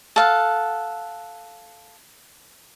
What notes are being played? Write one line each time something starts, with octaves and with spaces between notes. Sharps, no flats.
A4 F5 F#5